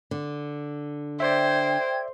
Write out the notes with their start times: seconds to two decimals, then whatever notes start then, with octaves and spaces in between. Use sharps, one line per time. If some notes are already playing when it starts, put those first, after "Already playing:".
0.11 D3
1.20 C5 D5 E5 G5 G#6